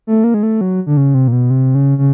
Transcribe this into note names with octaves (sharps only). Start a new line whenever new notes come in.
A3
A#3
G#3
A3
F#3
D3
C#3
C3
A#2
B2
C3
C#3
C#3